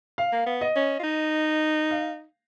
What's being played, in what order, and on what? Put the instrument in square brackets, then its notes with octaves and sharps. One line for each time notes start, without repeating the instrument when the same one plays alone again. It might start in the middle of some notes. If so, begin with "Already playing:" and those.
[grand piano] F5
[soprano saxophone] A#3
B3
[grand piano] D#5
[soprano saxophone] C#4
F4
D#4
[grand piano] F5